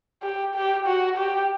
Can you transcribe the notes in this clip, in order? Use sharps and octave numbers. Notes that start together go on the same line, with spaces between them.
G4
G4
F#4
G4